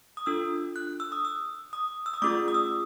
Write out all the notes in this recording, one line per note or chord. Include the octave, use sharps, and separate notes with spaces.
D#6
D4 F4 A4 E6
F#6
E6
D#6
E6
D#6
E6
D#6
A3 C#4 F4 G#4 D6
D#6
E6